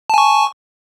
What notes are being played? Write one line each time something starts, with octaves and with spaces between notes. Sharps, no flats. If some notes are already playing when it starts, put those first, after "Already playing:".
G#5 A5 C#6